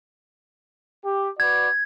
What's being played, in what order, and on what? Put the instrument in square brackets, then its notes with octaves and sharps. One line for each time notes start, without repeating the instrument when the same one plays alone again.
[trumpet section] G4
[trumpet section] F#4 B4 D5 [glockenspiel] G#6